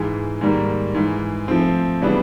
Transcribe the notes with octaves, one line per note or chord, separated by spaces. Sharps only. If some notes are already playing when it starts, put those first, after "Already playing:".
Already playing: G#2 E3 G#3
G#2 D#3 G3 A#3
G#2 E3 G#3
F3 A3 C4
C#3 E3 G3 B3 D4